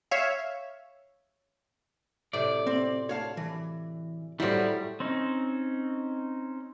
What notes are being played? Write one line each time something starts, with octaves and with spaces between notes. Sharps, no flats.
C#5 E5 F5
A2 C3 F#3 D5
C4
C#5 F5 A5
E3
A2 F#3 G3 E4 F#4 C5
C4 C#4 D#4